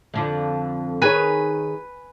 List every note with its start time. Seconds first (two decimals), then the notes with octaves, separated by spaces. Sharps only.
0.14 F2 D3 F3
1.02 D#3 G#4 B4 C#5 G#5